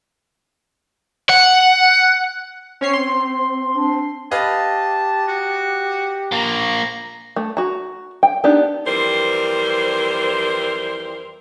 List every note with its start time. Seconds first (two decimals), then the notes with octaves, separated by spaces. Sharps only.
1.29 F#5
2.81 C4 C#4 C5 C#5 C7
2.93 C6
3.74 D4
4.31 G4 B4 D#5 F5 A5
5.28 F#4
6.32 F3 A#3 A#5
7.36 A3
7.57 F#4 A#5
8.23 G5
8.44 B3 D4 D#4 G4
8.86 F2 E3 G3 C4 A#4 C5